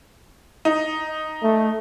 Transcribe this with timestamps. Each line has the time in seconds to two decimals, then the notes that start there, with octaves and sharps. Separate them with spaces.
0.65 D#4
1.43 A3